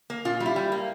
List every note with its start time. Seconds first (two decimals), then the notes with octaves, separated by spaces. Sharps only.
0.10 A#3
0.25 A#2 F4
0.40 G3
0.46 E4
0.56 G3
0.72 A#3